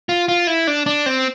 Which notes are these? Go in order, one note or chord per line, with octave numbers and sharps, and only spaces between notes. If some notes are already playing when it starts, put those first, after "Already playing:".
F4
F4
E4
D4
D4
C4